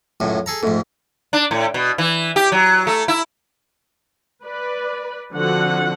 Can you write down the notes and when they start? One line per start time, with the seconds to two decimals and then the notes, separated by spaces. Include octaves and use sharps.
0.20 C#2 F#2 A2
0.46 G#4 A4 A#5
0.63 F2 G#2 A3
1.33 D4
1.51 A2
1.74 B2
1.98 E3
2.36 G4
2.52 F#3
2.87 A3
3.08 E4
4.44 B4 D5
5.34 D3 F3 C4 F#4 F#5